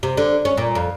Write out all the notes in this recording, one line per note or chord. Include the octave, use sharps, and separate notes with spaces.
C3
D3
C#4
A#2
F2